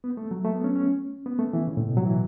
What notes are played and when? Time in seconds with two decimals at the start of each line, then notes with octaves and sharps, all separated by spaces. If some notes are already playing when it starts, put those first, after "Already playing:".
0.04 B3
0.17 A3
0.31 F#3
0.44 A3
0.55 B3
0.64 C#4
0.75 C#4
1.26 B3
1.39 A3
1.53 E3
1.67 C#3
1.77 A2
1.87 B2
1.97 F#3
2.05 E3